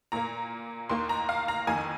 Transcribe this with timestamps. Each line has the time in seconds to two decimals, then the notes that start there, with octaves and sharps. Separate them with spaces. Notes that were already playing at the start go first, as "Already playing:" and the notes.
0.12 A#2 A#3 A#5
0.89 D#2 D#3 A#3 C6
1.09 A#5
1.29 F5
1.48 A#5
1.67 F2 D#3 A#3 G#5